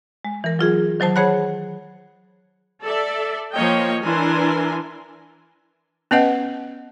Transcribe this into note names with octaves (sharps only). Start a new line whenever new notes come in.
G#3
E3 A#4
F#3 F4 G#4
D#3 F#3 C5 A5
G#4 C5 C#5 F#5 B5 F#6
A4 D5 E5
F3 A#3 C#5 D#5 G5
E3 D4 E4 A#4 G#5 C6
B3 C#4 B4 D#5 F#5